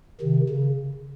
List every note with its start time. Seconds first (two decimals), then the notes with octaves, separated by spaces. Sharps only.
0.21 C3 D#3
0.49 C#3